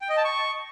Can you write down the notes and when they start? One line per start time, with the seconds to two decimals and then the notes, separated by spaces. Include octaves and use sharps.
0.02 G5
0.09 D#5
0.17 A5
0.25 C#6